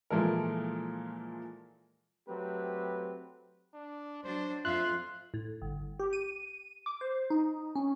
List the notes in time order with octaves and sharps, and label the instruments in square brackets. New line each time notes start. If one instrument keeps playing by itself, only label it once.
[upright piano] A#2 E3 F3 G#3 A4 A#4
[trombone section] F#3 A3 C4 G4 B4
[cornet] D4
[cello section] F#3 D4 [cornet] C5
[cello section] F2 F5 [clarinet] F4 [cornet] E5 [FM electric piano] F#6
[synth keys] A2
G1
G4
D#7
D6
C5
D#4
C#4